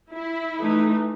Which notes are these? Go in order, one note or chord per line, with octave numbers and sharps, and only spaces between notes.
E4
E3 A3 D#4